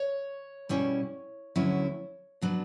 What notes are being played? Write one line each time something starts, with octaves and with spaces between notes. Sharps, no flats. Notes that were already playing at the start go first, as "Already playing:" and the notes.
Already playing: C#5
B2 G3 C#4 E4
D2 D3 F#3 C#4 E4
B2 F#3 B3 D4